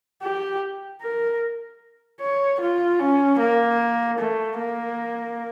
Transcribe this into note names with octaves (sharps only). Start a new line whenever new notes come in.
G4
A#4
C#5
F4
C#4
A#3
A3
A#3